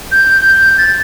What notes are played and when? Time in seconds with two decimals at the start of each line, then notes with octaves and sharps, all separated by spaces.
0.12 G6
0.40 G6
0.78 A6